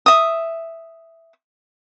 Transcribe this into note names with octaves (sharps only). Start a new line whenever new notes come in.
E5 D#6